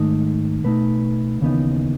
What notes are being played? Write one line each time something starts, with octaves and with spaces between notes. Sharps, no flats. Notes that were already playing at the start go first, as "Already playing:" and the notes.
Already playing: G#2 D#3 A3 D#4
B2 A3 D#4 B4
D#2 C#3 E3 B3 D#4